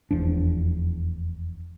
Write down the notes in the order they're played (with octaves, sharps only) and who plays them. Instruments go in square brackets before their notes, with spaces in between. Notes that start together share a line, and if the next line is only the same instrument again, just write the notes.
[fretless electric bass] F1 E2 F3 D4